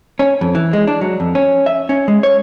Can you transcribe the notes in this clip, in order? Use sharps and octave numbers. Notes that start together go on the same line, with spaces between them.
C#4
F2
E3
G#3
D4
F#3
F2
C#4
E5
C#4
G#3
C#5